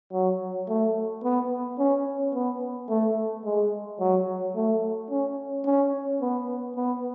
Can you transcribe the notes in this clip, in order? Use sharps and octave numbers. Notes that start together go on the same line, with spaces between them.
F#3
A3
B3
C#4
B3
A3
G#3
F#3
A3
C#4
C#4
B3
B3